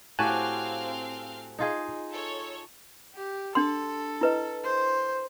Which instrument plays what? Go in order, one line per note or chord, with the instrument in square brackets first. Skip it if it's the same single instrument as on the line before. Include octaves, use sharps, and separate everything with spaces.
[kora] A2 F#4 G4 [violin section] C4 F5 [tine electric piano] G#5 A5 F#6
[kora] D#4 F4 G#4
[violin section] A4 C#5
[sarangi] G4
[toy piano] D4 C6 [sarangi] A4
[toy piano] E4 B4 D#5
[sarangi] C5